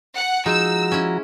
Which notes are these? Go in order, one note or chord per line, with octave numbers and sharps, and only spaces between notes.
F#5
F3 G#3 D#4 F#4 A#5 E6
C#4 E4